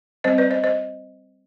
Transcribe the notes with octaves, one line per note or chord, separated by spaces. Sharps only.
G3 C4 C5 D#5
B4 D5
C5 D#5
C5 D#5